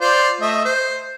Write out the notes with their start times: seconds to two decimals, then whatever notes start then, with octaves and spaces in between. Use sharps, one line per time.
0.01 F4 C5 D5
0.41 A3 D#5 E5
0.65 C5